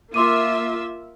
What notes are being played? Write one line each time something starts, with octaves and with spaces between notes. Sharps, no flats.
A#3 F4 E5 C6 D6 D#7